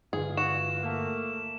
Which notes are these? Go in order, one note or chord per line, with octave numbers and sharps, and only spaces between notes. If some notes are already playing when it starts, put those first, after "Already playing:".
G2 D3 E3 G#3 F4 G#4
F#4 E7
A3 A#3